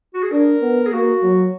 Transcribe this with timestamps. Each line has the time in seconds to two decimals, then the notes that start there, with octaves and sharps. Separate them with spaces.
0.14 F#4
0.23 G#4
0.31 D4 A#4
0.62 B3
0.86 G#4
0.92 A#3 F#4
1.23 F#3